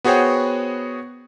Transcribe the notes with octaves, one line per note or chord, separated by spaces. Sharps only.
B3 F#4 G#4 C5 C#5 G5